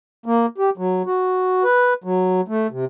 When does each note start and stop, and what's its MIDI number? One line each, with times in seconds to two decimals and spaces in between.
0.26 0.46 58
0.58 0.70 67
0.78 1.02 54
1.06 1.63 66
1.64 1.94 71
2.04 2.41 54
2.48 2.67 57
2.71 2.85 48